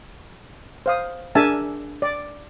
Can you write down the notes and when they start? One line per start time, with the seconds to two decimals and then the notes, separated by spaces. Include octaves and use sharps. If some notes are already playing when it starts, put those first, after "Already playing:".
0.86 C5 F5 D#6
1.35 D4 G#4 A#4 E5 G#5 A5
2.02 D5